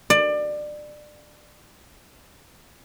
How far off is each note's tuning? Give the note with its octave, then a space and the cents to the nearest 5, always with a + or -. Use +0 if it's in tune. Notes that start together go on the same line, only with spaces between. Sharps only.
D5 +25